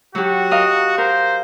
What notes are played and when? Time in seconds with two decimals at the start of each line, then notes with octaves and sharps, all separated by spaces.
0.15 F#3 F#4 G4
0.51 A#4 D#5 F5
0.98 A#4 C5